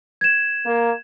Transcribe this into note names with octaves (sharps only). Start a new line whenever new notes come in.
G#6 E7
A#3